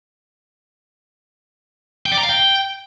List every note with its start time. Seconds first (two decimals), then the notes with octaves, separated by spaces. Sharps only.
2.06 G5
2.12 D5
2.18 A#5
2.23 F5
2.29 G5